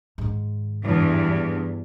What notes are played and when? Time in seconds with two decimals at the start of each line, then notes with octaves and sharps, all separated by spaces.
0.18 G#2 D#3
0.83 E2 G2